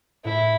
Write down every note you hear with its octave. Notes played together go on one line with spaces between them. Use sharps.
A2 E4